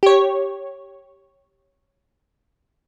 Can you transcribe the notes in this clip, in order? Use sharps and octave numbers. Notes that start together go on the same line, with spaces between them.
G4 C#5